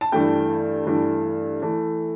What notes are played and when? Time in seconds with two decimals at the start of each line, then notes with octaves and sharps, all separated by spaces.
0.01 A5
0.12 G2 E3 A3 G5
0.86 G2 E3 A3
1.62 E3 A3